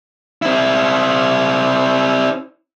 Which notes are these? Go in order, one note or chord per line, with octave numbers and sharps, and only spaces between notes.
C4 E4